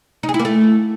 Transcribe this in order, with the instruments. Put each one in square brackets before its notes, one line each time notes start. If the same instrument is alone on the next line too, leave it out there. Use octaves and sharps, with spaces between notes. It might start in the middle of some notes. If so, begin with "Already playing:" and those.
[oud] D#4
G#4
E4
A#3
A3